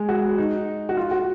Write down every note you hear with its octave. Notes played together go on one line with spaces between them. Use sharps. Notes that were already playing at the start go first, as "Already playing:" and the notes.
Already playing: G#3
F#4
D#4
F#4
F4
F#4